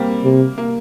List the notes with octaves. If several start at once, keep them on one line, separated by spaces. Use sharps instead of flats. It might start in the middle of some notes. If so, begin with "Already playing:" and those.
Already playing: G3 A#3 C4
C3
A#3